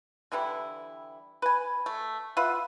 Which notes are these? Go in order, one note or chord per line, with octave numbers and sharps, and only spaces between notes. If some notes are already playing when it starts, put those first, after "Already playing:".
D3 E3 G3 E4
B4 G#5
A3
F4 B4 E5 F#5